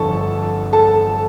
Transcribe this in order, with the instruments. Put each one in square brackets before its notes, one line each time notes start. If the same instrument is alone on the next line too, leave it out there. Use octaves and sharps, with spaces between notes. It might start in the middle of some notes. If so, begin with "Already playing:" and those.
Already playing: [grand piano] G1 F2 D3 F3 [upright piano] A4 A5 C#6
[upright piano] A4 A5